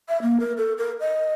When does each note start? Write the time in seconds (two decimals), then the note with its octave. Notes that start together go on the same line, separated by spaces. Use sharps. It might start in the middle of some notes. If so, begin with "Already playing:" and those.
0.09 E5
0.22 A#3
0.40 A#4
0.58 A4
0.78 A#4
1.00 D#5